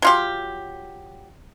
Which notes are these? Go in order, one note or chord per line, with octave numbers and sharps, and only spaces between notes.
F#3 F4 G4